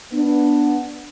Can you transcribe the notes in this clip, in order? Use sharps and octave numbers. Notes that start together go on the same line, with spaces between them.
B3 D4